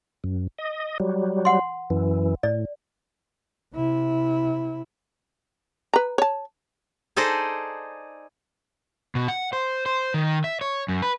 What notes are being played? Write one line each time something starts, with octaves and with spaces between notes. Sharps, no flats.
F#2
D#5
F#3 G3
F#5 C6
F#2 E3
A2 D5
C3 E4
B4 A#5
C#5 A5
D#4 G#4 A4 C5 D5 D#5
B2
F#5
C5
C5
D#3
E5
C#5
F#2
B4